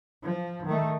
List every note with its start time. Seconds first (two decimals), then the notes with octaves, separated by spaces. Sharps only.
0.24 F3
0.66 D#3 A3